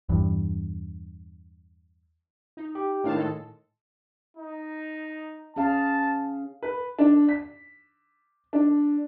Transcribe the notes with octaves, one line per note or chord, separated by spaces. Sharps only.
E2 G2
D#4
G4
A2 D#3 D4 F5 A5
G#3 A4
D#4
C#4 G#4 F5 A5
B4
D4
B6
D4